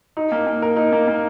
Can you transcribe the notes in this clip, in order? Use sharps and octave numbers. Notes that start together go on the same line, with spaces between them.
D#4
A#3
A#3
A#4
D#4
A#3
A#3